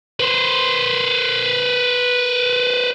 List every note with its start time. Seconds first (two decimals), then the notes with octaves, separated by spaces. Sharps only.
0.20 B4 C5